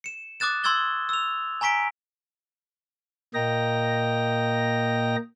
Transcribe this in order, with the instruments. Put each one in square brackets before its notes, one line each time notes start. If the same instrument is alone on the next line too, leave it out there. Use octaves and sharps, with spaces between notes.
[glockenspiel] C#7 E7
D6 D#6 F#6 A6 E7
C6 C#6 E6 G#6 A6 G7
E6 F7
G#5 A#5 C#6 B6 D7
[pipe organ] A#2 A#3 D#5 G5 A#5 A#6